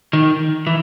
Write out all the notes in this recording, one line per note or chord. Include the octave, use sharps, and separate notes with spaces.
D#3
E3